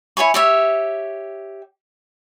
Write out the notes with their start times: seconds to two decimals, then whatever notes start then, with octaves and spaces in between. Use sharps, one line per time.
0.17 E4 C#5 G#5 C#6
0.34 G4 C#5 E5